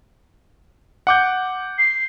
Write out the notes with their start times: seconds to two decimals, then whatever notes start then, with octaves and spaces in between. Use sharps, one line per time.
1.07 F#5 D6 G6
1.78 C7